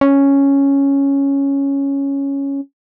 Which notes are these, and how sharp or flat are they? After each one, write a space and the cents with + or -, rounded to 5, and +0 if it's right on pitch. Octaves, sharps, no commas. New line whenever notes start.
C#4 +0